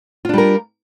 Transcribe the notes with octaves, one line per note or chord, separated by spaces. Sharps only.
G3 D4 F4 A#4